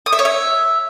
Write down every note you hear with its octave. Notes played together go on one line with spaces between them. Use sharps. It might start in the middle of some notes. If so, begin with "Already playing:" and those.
D#6
E5
C#5
E5